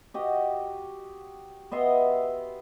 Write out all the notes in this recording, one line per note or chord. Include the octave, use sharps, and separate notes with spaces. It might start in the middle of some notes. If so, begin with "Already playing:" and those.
F#4 G4 D#5
B3 D#5 E5 C6